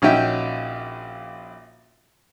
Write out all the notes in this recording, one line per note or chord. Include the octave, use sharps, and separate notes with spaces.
A#1 C#4 D#4 F#4 E5 G5